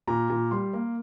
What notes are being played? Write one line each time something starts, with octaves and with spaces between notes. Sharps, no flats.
A#2 A#5
A#2
G3 C6
A#3